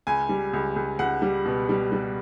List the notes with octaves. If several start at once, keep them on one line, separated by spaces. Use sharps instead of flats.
C#2 G#5
G3
C#2
C#2
C#2 F#5
G3
B2
G3
G3